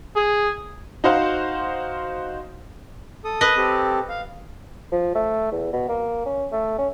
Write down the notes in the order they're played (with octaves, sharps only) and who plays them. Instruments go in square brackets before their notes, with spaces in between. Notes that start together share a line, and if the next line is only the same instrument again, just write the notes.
[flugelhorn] G#4
[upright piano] D#4 F#4 C5 F5
[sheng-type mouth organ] A4 D#6
[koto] B4 D#5
[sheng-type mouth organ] C4 G4 A4
F5
[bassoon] F3
A3
E2
B2
A#3
C#4
A3
C#4